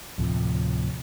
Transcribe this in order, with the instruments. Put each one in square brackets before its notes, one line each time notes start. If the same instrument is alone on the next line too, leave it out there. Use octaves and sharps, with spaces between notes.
[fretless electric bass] D2 A2 C3 F3